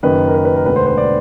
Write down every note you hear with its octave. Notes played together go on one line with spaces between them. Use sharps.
F#1 F#2 D#3 B4
A#4
B4
B4
A#4
E1 D2 D3 B4
C5
C5
D5